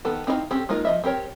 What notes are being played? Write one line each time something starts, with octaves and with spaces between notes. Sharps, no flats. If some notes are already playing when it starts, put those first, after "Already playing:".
D#3 B3 A4 A5
C4 D#4 E4 C#5 F5
C4 C#4 G4 A4
G#3 A#3 D#4 F4 A#4
F3 D#5 E5
C4 G4 A#4 C#5